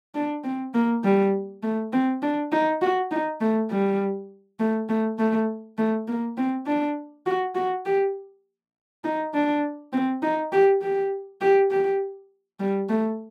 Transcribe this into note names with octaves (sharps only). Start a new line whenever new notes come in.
D4
C4
A#3
G3
A3
C4
D4
D#4
F#4
D#4
A3
G3
A3
A3
A3
A3
A#3
C4
D4
F#4
F#4
G4
D#4
D4
C4
D#4
G4
G4
G4
G4
G3
A3